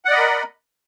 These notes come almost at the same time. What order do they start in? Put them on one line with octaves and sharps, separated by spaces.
F#5 D5 D#5 B5 A#4